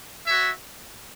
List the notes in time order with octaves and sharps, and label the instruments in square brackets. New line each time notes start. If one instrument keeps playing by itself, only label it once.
[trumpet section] F#4 C#5 E5